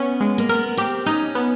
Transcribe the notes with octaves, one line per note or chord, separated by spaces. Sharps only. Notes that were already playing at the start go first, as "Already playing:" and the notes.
Already playing: B3 C#4
G#3
A#3
B3 A#4
C4 G4
C#4 D#4
B3